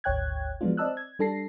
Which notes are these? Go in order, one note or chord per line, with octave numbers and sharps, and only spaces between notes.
G#1 D2 C#5 G5 F#6 G#6
F3 F#3 G#3 B3 D4 F4
C4 D5 D#5 A5 E6 F#6
G#6
G3 D4 A4 A5 A#6 C7